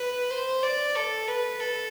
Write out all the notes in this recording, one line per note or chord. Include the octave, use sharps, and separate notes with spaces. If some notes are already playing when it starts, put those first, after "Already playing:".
Already playing: B4
C5
D5
A4
B4
A4